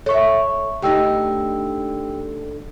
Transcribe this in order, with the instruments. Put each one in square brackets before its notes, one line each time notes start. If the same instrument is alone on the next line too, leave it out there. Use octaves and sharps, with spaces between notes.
[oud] A4 E5 [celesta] C#5 C#6
[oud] D2 D3 D#4 [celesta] G4 G5 E6